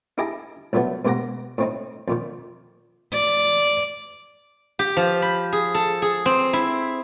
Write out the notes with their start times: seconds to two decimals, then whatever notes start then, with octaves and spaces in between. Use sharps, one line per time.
0.18 D#4 E4 G4 G#4 A5 A#5
0.73 C2 A#2 F#3 A3 B3
1.05 G#2 B2 A#3 G4 F#5 A#5
1.58 A2 C4 D#4
2.08 F2 A#2 D#3
3.14 D5
4.79 G4
4.97 F3
5.22 B5
5.53 G#4
5.75 A4
6.02 G#4
6.26 C4
6.53 E4